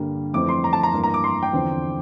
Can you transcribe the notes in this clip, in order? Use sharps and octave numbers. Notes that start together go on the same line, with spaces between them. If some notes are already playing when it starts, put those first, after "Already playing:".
Already playing: G2 D3 G3 A#3
F2 E3 A3 C4 D6
C6
A#5
A5
A#5
G2 E3 A#3
A#5
D6
C6
G5
E2 D3 F3 C4